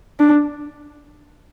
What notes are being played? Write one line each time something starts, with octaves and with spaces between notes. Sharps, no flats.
D4